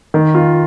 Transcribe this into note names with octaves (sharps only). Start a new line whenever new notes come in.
D#3
F4